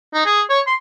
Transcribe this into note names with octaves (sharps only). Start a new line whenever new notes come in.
D#4
G#4
C#5
C6